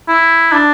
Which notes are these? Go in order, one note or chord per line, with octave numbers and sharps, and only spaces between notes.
E4
D4